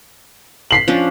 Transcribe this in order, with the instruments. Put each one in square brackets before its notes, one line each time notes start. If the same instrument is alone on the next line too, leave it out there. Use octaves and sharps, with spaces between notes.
[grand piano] B6 C7 F#7
[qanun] F3 C#4 D4